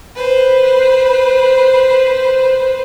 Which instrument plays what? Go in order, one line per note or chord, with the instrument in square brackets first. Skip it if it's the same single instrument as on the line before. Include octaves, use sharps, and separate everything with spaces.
[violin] B4 C5